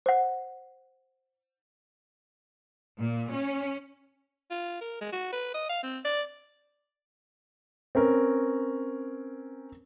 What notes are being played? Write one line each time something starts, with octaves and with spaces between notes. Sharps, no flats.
C5 F#5
A#2
C#4
F4
A#4
G#3
F#4
B4
D#5
F5
C4
D5
C4 C#4 A#4 B4